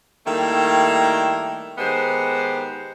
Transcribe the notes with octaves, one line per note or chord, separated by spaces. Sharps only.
D#3 G3 A3 A#3 E4
D#3 G#3 B3 G4 C5